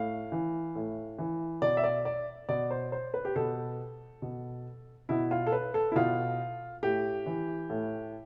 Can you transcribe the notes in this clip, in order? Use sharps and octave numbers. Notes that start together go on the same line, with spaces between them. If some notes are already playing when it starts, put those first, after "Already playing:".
Already playing: A2 F5
E3
A2
E3
B2 D5
E5
D5
D5
B2 D5
C5
C5
B4
G4
B2 A4
B2
B2 E4
F4
A4
B4
A4
E4
B2 F4
A2 G4
E3
A2